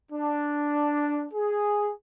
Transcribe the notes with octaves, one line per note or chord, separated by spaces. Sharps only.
D4
G#4